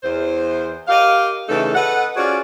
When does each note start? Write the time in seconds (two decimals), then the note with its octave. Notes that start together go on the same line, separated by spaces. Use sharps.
0.03 E2 C5
0.88 G4 A#4 D#5 F5
1.48 C#3 E3 A3 D#4 A4
1.75 A4 B4 D#5 F#5
2.16 C#4 F4 F#4 G#4 C5 D5